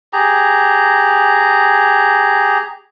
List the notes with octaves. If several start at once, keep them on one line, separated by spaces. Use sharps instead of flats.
G4 G#4 A#5